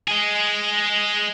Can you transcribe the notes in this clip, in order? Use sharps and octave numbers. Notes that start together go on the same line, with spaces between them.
G#3 G#4